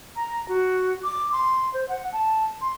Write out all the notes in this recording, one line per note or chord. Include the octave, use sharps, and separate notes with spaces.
A#5
F#4
D6
C6
C5
F#5
A5
C6